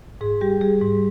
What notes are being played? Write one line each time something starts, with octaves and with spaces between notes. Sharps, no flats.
G#2 G#4
G3 G4
G3 G#4
G#2